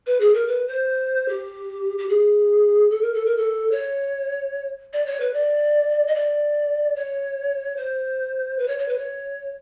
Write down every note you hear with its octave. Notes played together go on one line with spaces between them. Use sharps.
B4
G#4
A#4
B4
C5
G4
G4
G#4
A4
A#4
A4
A#4
A4
C#5
D5
C#5
B4
D5
D#5
D5
C#5
C5
B4
C#5
C#5
B4
C#5